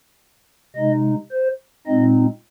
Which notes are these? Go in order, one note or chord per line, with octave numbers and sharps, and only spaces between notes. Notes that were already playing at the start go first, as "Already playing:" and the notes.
C3 G#3 D#4 D#5
C5
A#2 G#3 C4 D#4 D#5